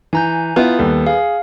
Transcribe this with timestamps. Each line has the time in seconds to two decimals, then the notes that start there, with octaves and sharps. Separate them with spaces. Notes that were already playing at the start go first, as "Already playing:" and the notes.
0.13 E3 G#5 A#5 G6
0.56 B3 E4 F4
0.79 D#2 G3 A4
1.07 G#4 F5